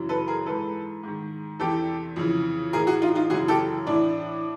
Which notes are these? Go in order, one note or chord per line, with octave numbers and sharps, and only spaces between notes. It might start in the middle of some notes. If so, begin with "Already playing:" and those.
Already playing: F#2 C#3 E3
A4 B4
G#4 A#4
G#2 E3 A4 B4
G#2 D#3
E2 C3 E3 G4 A4
F2 C#3 E3
A2 E3 G#4 A#4
F#4 G#4
D#4 F4
D#4 F4
F#2 C#3 E3 F#4 G#4
G4 A4
A2 E3 D4 E4